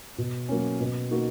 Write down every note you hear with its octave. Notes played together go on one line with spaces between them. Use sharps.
B2
F#3 A#3 C#4
B2
A#3 D#4 F#4